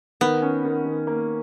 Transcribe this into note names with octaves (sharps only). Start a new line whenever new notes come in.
D#3 B3
C#4
D#3
D#3
A#3